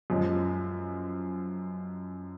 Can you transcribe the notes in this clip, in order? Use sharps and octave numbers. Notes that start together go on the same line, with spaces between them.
F#2 F3 G#3